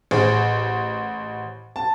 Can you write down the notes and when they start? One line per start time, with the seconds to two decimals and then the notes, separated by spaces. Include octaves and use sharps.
0.11 A1 G#4 C5
1.76 A5